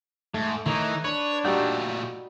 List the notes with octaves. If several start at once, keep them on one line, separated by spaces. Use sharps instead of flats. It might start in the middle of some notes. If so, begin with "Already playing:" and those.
G#2 A3
D#3 E3 A3 D#4 C#5
D4 B4 C#5
A#2 G3 A3 D#4 F#4 G6